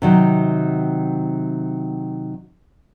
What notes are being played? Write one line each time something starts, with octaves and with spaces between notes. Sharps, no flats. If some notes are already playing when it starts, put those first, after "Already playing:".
C3 D#3 F#3